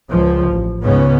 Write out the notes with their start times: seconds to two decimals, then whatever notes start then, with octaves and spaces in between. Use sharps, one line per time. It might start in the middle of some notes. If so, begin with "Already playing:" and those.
0.11 C#2 F3
0.51 A1
0.82 C#2 G#2 C#3 B3 C#4